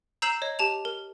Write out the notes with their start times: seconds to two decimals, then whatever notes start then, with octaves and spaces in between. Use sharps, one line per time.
0.22 A#5 E6 G6 C7 E7 F#7
0.42 C#5 D#5
0.59 G4 A5 F7
0.85 A#4